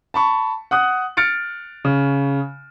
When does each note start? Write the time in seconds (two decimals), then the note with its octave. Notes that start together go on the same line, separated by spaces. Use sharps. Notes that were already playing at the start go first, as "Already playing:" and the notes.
0.14 A5 B5 C#6
0.71 F#5 D#6 F#6
1.17 F6 A6 C#7 D7
1.85 C#3